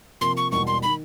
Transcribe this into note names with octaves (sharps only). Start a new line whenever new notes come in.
C3 F3 A#3 C6
C#6
E1 E2 B2 G3 A#3 C#6
C6
D#3 B5